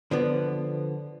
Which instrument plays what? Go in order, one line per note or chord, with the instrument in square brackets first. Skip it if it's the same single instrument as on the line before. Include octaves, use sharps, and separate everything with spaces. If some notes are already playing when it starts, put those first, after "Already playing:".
[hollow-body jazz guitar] D3 F3 B3